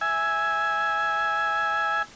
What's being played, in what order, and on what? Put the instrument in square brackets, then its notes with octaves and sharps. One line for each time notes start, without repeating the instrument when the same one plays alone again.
[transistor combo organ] E5 G#5